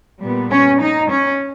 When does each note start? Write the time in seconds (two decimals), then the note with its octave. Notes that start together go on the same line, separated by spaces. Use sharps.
0.22 A#2 G3 B3
0.50 C#4
0.80 D#4
1.09 C#4